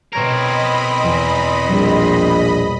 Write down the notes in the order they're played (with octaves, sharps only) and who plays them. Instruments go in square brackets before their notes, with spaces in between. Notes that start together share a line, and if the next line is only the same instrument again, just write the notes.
[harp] B2 C#5 G#6 [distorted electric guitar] C4 A#4 [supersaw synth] D#5 B5
[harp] E2
[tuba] A#1 [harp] G3